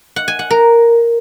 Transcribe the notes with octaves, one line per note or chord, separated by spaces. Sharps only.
F#5
G#5
F#5
A#4